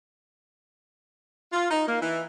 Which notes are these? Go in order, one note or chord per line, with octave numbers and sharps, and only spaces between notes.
F4
D#4
A#3
E3